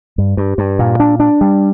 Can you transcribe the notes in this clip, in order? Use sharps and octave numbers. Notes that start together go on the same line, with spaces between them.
G2
G2
G2
A#2
D4
D4
G3